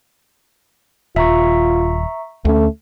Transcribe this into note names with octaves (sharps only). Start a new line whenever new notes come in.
D#1 F4 E5 A#5 C#6
D2 A3 C#4